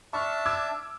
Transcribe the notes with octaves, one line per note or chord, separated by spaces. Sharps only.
D4 E5 A5 C#6 F6
D6 E6 G#6